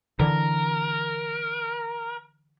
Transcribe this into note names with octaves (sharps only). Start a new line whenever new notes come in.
D3 E3 A#4